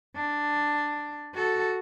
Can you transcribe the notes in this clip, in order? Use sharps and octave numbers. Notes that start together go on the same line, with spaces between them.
D4
F#4 A4